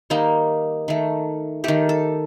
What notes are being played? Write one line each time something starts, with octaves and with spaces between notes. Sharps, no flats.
D#3 G3 A#3 D#4
D#3 A3
D#3 A3 G4
A4